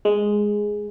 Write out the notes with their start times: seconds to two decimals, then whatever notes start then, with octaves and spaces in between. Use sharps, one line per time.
0.05 G#3